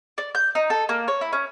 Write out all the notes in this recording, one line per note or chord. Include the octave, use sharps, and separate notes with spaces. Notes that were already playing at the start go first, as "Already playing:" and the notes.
D5
G6
D#4
A4
A#3
C#5
E4
C#4